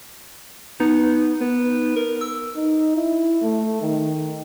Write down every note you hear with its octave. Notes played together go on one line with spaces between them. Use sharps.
B3 D#4
B3
A#4
E6
D#4
E4
A3
D#3